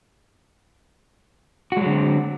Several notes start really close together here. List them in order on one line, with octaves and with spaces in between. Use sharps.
F#4 G#3 F#3 D3 C4